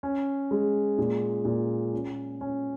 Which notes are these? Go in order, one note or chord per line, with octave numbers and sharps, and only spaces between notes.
C#4
G#3
A#2
A#2
C#4
C#4